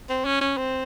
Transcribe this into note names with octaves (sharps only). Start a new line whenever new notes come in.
C4
C#4
C#4
C4